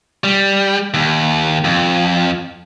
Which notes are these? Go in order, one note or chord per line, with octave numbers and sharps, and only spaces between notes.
G3
D#2
F2